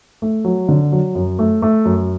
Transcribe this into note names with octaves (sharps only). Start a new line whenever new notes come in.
A3
F#3
D3
F#3
F#2
A3
A3
F#2